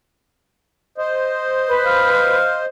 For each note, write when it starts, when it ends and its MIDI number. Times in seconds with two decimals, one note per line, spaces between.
0.98 2.65 72
0.98 2.65 75
1.68 2.35 71
1.86 2.61 77